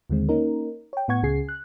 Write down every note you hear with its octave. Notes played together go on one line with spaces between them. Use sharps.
D#2 D3 D#3 G#3 C4
A#3 C#4 D#4 A#4
C#5 G5
A2 B3 F#5 C#6 G#6
C#2 C#3 G#4 C7
F#6